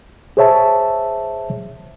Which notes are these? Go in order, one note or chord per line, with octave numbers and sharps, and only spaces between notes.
G#4 C5 C#5 E5 A5